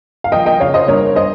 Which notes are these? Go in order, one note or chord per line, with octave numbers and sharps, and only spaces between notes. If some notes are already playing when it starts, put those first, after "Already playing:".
F5
F3 D#5 G5
D#5 G5
C#3 C#5 F5
C5 D#5
G2 A#4 C#5
C5 D#5